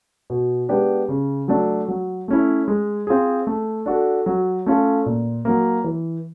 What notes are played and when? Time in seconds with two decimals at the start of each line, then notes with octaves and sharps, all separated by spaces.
0.30 B2
0.69 G#3 B3 D4 G4
1.09 C#3
1.48 F#3 A3 D4
1.88 F#3
2.28 A3 C#4 E4
2.68 G#3
3.07 C4 F4 G#4
3.47 A3
3.86 D4 F#4 A4
4.26 F#3
4.66 A3 C#4 F4 A4
5.06 A#2
5.45 F#3 A#3
5.84 E3